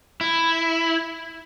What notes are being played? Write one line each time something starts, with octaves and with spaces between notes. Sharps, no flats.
E4